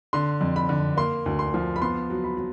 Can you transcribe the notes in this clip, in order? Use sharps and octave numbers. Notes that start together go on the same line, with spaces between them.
D3 C6
F2
B5
D3
A#3 C6
D2
C6
F3
B5
B3 C6
F#3
B5
F#3